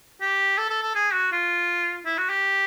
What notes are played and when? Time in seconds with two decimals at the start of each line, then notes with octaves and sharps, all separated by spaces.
0.21 G4
0.58 A4
0.70 A4
0.83 A4
0.95 G#4
1.13 F#4
1.32 F4
2.06 E4
2.18 F#4
2.29 G4